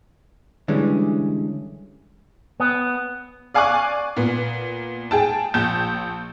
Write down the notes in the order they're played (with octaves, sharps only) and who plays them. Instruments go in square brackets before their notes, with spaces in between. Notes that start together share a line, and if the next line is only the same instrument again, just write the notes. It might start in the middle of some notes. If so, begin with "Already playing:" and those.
[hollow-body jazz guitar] D3 E3 G3 G#3 C#4
[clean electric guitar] B3
[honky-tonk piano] D5 F5 G#5 C#6 D6 F#6
A#2 B3
G#4 G5 A5
A#1 A5 G6 E7